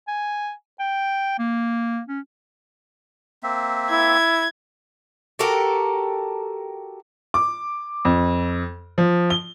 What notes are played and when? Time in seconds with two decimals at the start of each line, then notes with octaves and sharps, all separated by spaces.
0.08 G#5
0.80 G5
1.39 A#3
2.09 C#4
3.43 A#3 C4 E5
3.91 E4 G#6
5.39 F#4 G4 A4 A#4
7.34 D6
8.05 F2
8.98 F3
9.30 G7